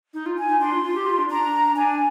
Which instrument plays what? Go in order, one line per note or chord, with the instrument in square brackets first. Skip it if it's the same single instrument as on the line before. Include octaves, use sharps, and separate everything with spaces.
[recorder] D#4
F4
[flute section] G#5
[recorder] D#4
[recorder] D4 [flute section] C6
[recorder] F4
F4
G4
F4
D4
[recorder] D4 [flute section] A#5
[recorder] D4 [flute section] G#5